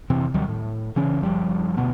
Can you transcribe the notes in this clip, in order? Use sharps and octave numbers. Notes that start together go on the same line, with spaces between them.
F1 C3 E3 C4
D#2 D#3 F#3 G3
A2
C#3 E3 C#4
F#1 F3 G3
D2 B2 B3